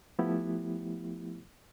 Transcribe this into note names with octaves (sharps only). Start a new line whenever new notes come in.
F3 A3 B3 E4 G4